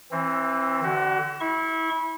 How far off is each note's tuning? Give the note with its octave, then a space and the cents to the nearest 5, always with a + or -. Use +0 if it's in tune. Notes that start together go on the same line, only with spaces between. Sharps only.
E3 +0 C4 +30
D3 +0 F#4 +35
E4 -25 C#6 -30